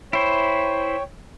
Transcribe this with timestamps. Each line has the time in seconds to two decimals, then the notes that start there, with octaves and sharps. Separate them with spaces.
0.13 E4 C5 C#5 G5